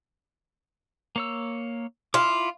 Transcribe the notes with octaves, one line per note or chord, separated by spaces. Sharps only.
A#3 C#5 E6
E4 F4 D6